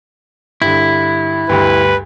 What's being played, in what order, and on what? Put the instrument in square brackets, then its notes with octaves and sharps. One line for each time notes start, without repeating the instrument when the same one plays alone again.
[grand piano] G2 D3 [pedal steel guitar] E4
[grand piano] D2 G2 [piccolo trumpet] B4